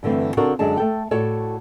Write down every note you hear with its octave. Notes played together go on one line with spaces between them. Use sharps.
G2 D3 E3 A3 C4
C#3 C4 D4 F#4 A4 A#4
F#2 D3 G#3 D4 A5
A3 A4 G5
A2 F#4 A4 C#5 D5